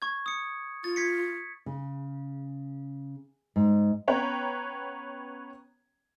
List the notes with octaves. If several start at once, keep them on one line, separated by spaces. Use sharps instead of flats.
C#6 G#6
D#6 C#7
F4 A6
G#6 B6 C#7
C#3
G#2
B3 C#4 B4 C#5 G5 A#5